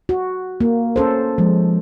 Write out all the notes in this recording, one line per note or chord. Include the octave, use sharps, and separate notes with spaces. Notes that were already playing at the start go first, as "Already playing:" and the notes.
F#4
A#3
C#4 A4 C5
F3 G#3